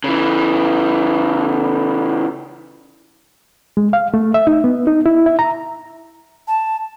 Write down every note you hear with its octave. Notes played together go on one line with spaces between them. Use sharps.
C#3 E3
G#3
F5
A3
E5
D#4
B3
D#4
E4
E5
A#5
A5